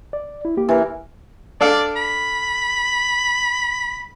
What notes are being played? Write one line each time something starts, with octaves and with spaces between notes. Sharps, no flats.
D5
E4
A#3 G4
E3 A#4
D4 A4 D5 F5
B5